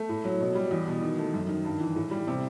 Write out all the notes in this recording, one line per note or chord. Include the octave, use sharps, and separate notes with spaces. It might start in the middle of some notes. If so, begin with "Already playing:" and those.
Already playing: A3
A2
F#3
B2
G3
E2
B2
D#3
A3
F#2
D#3
G2
E3
A2
G3
C3